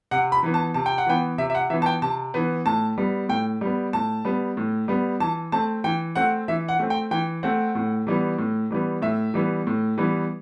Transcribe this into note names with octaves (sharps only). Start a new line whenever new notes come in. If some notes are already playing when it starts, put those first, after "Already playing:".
C3 F#5
B5
E3 B3
A5
C3 A5
G5
F#5
E3 B3 G5
C3 E5
E5
F#5
E3 B3 E5
A5
G5
C3 A5
E3 B3
A2 A5
G3 B3
A2 G5
G3 B3
A2 A5
G3 B3
A2
G3 B3
E3 A5
A3 C4 A5
E3 G5
A3 C4 F#5
E3 E5
F#5
A3 C4
G5
E3 G5
A3 C4 F#5
A2
E3 G3 B3
A2
E3 G3 B3
A2 E5
E3 G3 B3
A2
E3 G3 B3